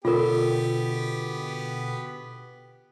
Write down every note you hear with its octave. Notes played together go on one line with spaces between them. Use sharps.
B2 D3 B3 F4 G4 A4 A#4 G5